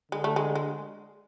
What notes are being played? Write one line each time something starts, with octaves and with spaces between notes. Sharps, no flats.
D3 G#3
A3
G#3
G#3